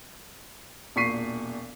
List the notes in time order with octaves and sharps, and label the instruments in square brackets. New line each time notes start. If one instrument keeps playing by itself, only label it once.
[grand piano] E1 A#2 C#6 B6 C7 D#7